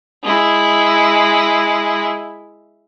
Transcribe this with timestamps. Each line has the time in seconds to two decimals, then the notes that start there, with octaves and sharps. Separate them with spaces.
0.23 G#3 E4